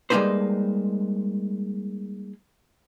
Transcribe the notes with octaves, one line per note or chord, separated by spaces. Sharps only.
G3 G#3 A#3 D#4 B4 C5